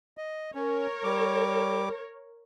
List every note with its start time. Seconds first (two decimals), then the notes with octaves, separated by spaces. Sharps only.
0.18 D#5
0.55 C#4 A#4 C#5
1.04 G3 D6